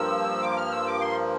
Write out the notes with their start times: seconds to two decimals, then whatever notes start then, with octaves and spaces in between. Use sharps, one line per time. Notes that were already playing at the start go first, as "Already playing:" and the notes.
Already playing: G2 F3 A#3 E6
0.42 D6
0.57 F6
0.72 E6
0.87 D6
1.01 C6